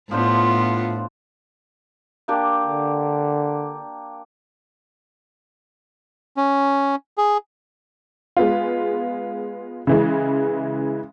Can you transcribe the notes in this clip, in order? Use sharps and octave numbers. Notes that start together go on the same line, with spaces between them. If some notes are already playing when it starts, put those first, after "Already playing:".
A2 F3 B3 D4 F4 C5
A#3 D4 G4
D3
C#4
G#4
G#3 B3 F4
C#3 E3 G#3